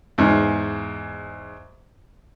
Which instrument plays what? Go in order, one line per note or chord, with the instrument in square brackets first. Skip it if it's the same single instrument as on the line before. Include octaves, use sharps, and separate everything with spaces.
[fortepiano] E2 G#2